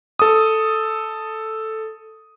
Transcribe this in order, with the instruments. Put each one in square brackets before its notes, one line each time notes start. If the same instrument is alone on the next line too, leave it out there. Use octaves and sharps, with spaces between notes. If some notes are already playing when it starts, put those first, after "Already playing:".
[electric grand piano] A4 D#6